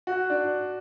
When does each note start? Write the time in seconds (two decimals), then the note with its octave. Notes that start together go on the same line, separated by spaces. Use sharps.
0.07 F#4
0.30 D4